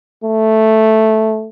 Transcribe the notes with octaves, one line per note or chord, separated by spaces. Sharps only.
A3